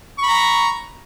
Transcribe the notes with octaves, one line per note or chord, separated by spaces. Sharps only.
A#5 B5 C#6